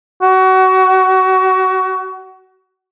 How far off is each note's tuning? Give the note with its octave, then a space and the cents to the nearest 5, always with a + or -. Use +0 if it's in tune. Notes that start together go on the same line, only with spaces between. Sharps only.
F#4 +25